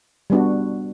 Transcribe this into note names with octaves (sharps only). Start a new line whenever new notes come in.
G3 B3 D4 F#4